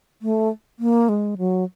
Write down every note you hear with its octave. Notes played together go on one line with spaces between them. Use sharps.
A3
A#3
G#3
F#3